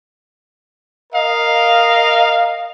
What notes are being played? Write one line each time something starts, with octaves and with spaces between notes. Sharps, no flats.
A#4 D#5 F5